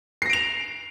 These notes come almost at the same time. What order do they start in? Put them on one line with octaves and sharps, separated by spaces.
C7 A#6 D7 F7